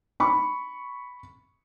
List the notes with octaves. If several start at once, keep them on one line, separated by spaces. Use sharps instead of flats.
B5 C#6